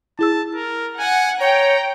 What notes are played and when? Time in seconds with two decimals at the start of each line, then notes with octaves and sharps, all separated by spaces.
0.19 E4 G#4 A5 E6
0.55 A#4
0.99 F#5 G#5
1.41 C#5 G5 A#5